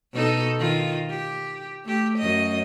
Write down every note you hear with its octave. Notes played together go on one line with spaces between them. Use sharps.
B2 D#4 A4
D#3 F4
G4
A3 G4
F#2 D#5